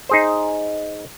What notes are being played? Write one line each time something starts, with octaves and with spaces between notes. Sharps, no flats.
D#4 G#4 C5